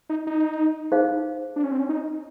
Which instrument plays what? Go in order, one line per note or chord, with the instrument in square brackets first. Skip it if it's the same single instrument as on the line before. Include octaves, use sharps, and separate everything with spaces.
[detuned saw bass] D#4
D#4
[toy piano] D#4 G#4 C5 F5
[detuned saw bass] D4
C#4
C4
C#4
D#4